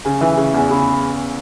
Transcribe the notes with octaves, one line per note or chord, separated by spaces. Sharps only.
C#3 G#5
E3 E5
C#3
E2 G#5
C#3 B5